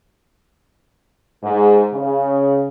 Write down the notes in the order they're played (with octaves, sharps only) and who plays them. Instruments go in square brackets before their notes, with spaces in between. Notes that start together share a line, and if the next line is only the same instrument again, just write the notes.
[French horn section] G#2
C#3